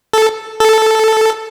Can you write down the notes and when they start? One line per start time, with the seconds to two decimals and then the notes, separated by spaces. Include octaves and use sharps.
0.14 A4
0.60 A4